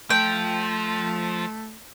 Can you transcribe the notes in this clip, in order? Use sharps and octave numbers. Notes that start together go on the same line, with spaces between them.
F3 A3 G5